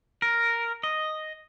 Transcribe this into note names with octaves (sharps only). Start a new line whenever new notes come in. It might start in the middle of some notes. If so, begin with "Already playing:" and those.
A#4
D#5